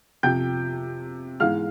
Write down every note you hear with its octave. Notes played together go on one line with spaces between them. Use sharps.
F2 C3 F3 G5 G6
G#2 E3 G#3 F5 F6